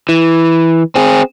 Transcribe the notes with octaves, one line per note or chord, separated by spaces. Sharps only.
E3
C4 G#4